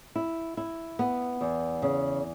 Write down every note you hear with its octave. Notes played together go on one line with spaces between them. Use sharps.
E4
E4
B3
E2
C#3